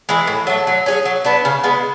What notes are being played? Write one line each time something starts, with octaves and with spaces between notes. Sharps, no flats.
E3 G#3
A2
F#3 A3
F#3
C#4 G#4
F#3
B3 D4
C#3
G#3 B3